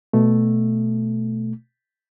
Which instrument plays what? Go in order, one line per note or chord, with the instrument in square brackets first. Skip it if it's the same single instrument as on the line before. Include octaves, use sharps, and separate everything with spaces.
[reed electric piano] B2 A3